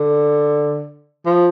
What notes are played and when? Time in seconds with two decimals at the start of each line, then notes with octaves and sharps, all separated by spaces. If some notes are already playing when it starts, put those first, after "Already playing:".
Already playing: D3
1.26 F3